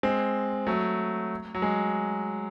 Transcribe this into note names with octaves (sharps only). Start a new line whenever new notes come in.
G#3 C4
F#3 A3
F#3
G#3